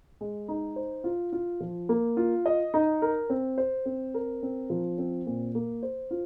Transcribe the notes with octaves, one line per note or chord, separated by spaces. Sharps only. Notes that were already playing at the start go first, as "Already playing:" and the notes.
G#3
D#4
C5
F4
F4
F3
A#3
F4
D#5
D#4
A#4
C4
C5
C4
A#4
C4
F3
C4
A#2
A#3
C5
F4